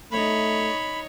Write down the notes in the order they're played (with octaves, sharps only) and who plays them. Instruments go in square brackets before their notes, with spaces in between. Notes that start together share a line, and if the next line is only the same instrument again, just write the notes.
[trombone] A3 [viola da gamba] D#4 C#5 [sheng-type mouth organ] B5